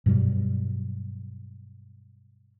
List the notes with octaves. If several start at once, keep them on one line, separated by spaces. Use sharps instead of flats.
G2 B2 F#3 G3